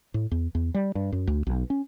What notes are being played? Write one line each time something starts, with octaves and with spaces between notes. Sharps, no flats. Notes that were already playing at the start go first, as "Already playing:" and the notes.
A2
E2
E2
G3
G2
F#2
D2
B1
C#4